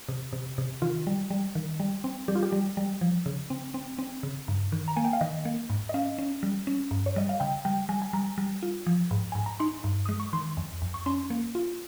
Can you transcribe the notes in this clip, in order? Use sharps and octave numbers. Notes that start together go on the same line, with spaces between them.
C3
C3
C3
D#3 F4
G3
G3
D#3
G3
C4
G3 G4
F4
G4
G3
G3
F3
C#3
C4
C4
C4
C#3
G2
D#3
A#5
A#3 G#5
G5
F5
D#3 D#5
A#3
G#2
D#5
C#4 F5
C#4
G3
C#4
G2
C#5
G3 D#5
F5
C#3 G5
G3 G5
G3 G#5
G#5
G3 A#5
G3
F4
F3
G#2
G#2 G#5
A#5
D#4 C6
G2
G#3 D#6
C#6
D#3 C6
F2
F2
C#6
C#4 C6
A#3
F4